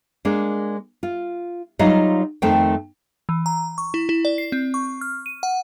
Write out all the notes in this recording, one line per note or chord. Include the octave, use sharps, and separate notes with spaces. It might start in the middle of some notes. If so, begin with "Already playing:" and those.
G#3 A#3 D4
F4
F#3 G3 D#4 F4 D#5 F5
F2 D#3 A3 C4 C5 G5
E3
A#5
C#6
E4
E4
D5
C7
C4
C#6
F6
D#7
F#5